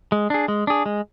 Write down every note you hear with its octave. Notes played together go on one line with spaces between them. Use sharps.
G#3
D4 G#4
G#3
D4 G#4
G#3